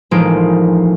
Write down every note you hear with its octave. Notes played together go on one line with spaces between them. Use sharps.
A1 F3 G#3 A#3 D#4 D7